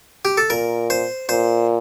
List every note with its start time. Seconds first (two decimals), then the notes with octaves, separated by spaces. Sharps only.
0.25 G4
0.38 A4
0.50 A#2 A#4
0.90 C5
1.29 A#2 C5